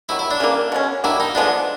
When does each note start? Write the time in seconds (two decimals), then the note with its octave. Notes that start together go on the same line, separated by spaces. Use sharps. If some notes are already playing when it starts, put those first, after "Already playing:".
0.09 C3 D#3 F#3 E4
0.19 E4
0.31 D4
0.40 C#3 E3 G3 A#3
0.72 B2 G#3 C#4
1.04 F#3 A#3 D4 E4 G4
1.20 D#4
1.35 D3 F3 G#3 B3 D4